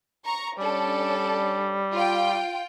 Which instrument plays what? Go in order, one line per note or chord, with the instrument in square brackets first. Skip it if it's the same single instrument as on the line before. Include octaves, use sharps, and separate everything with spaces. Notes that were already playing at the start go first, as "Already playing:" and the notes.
[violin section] A#5 C#6
[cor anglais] G3 [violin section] C#4 D4 A4
[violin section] F4 G5